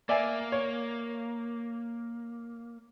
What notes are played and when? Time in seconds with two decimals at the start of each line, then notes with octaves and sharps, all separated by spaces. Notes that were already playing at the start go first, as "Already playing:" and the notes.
0.09 A#3 D5 E5 G#5
0.52 C#5